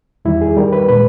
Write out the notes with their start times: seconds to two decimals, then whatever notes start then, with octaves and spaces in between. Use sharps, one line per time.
0.25 E2 D#3 G3 E4
0.41 G#4
0.57 D#2 D#3 G3 A#4
0.73 B4
0.88 A#2 G#3 B4